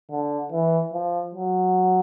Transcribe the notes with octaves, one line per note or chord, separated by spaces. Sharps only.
D3
E3
F3
F#3